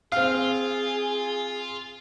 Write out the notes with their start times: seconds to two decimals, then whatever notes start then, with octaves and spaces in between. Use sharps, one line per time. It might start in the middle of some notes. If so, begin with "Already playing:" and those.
0.12 C4 F4 G#4 F5